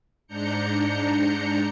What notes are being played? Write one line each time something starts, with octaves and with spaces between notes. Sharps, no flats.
G#2 D4 A#5 G6 C#7